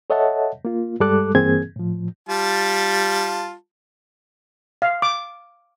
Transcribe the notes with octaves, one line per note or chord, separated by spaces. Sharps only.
A4 C#5 D#5 E5 F#5 A5
A#3 F4
G2 G3 G#3 A4 D6 F#6
G2 E3 A#3 C4 G#4 G#6
A2 F3
G3 F4 A5
F5
D6